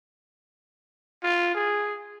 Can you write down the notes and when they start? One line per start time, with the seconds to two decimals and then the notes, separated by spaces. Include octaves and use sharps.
1.23 F4
1.55 G#4